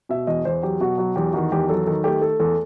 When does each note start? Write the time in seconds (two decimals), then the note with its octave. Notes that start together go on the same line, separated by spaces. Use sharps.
0.09 B2 E5
0.27 E2 D#5
0.45 E2 C5
0.63 F#3 G4
0.80 B2 F#4
0.98 F#3 F#4
1.16 E2 G4
1.33 D#3 F#4
1.52 E2 G4
1.69 F#3 A4
1.86 D#3 A4
2.04 A3 G4
2.21 A3 A4
2.40 E2 A4